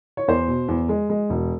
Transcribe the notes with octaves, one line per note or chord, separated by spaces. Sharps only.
C#5
E2 C5
B2
E2
G#3
G#3
E1